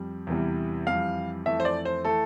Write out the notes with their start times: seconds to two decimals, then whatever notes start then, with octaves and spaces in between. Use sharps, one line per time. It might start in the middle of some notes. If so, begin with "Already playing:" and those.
Already playing: F2 G3
0.27 E2 C3 E3 G3
0.87 F2 E3 G3 F5
1.46 F2 E3 A3 E5
1.60 C5
1.65 D5
1.85 C5
2.05 E3 A3 A4